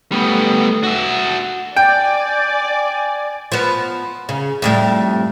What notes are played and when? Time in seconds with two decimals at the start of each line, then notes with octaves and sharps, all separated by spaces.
0.12 G3 A3 B3
0.83 F#4 E5
1.76 D5 G5 G#5
3.52 F3 B3
4.29 C#3
4.62 F2 A2 G3